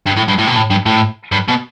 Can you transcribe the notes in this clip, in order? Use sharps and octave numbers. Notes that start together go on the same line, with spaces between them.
G2
A2
G2
A2
B2
A2
G2
A2
G2
B2